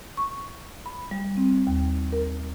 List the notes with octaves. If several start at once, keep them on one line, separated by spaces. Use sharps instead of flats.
C#6
B5
G3
C4
D#2
A#4